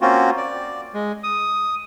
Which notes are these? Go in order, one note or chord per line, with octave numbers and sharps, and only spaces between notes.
A#3 C4 C#4 F4 F#4
D5
G#3
D#6